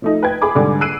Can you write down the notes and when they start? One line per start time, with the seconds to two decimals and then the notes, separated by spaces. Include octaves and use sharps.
0.02 F3 A3 D#4
0.23 B4 G5 G#6
0.42 G#4 G#5 B5 D6
0.55 G#2 D3 G3 G#5 D6
0.81 E6 F#6 C7 D7 D#7